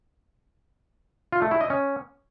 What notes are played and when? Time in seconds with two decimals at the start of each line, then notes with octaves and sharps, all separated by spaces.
1.32 F4
1.42 A3
1.51 E4
1.61 D#5
1.70 C#4